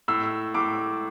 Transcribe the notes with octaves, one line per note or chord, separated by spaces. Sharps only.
A2 E6
A2 D6